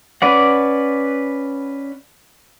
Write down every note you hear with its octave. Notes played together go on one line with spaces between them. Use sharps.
C#4 B4 D5 F#5